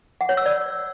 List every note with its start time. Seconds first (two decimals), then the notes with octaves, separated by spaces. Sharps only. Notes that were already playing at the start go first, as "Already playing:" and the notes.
0.21 F#5
0.29 C#5
0.37 E6
0.46 D5